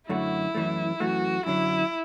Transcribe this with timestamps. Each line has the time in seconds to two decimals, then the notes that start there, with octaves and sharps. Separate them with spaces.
0.09 F#2 D3 A3 E4 F#4
0.55 F#2 E3 A3
1.00 F#2 E3 A3 F#4
1.46 F#2 D3 F#3 E4